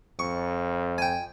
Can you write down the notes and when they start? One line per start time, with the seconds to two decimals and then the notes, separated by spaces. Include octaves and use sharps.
0.19 F2 C#6
0.98 G5 G#5